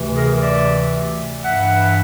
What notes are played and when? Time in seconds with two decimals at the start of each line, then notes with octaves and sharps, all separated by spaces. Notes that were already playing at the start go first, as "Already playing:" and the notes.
Already playing: D2 C3 E3
0.15 G#4 A#4
0.40 D5 E5
1.42 G2 E3 E5 F#5